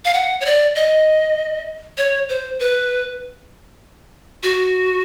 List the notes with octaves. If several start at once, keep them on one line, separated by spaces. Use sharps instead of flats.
F5
F#5
C#5
D5
D#5
C#5
C5
B4
F#4